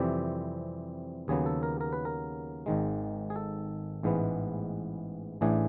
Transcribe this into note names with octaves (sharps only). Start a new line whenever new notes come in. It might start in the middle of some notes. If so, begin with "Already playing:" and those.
Already playing: F2 C3 E3 G3 C4 G4
D#2 C#3 F#3 B3 G#4
A4
A#4
A#4
B4
A#4
G#1 G#2 D#3 G#3
G#4
A4
A1 G#2 E3 G#3 B3
A1 A2 E3 A3 D4 G#4